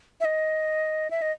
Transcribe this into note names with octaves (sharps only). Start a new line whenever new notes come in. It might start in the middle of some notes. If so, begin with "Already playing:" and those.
E5
D#5
E5
D#5